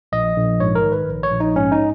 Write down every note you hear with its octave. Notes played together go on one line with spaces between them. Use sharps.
A#1 D#5
A#1
G#2 C#5
A#4
D#3
B4
A#1
C#5
A#1
D#4
G#2 C#4
D#4